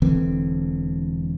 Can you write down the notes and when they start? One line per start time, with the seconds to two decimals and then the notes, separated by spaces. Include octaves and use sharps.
0.02 E1 D3 E3 C4